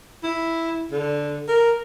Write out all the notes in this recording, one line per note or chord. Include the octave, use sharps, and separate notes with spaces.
E4
D3
A#4